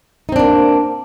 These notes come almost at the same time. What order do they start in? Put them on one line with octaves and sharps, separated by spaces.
D#4 C4 D4 A#3